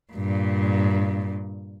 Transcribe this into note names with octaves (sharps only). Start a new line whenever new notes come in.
G2 A#2